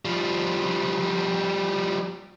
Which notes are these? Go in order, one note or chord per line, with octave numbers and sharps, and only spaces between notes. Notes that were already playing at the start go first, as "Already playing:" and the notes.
F3 G3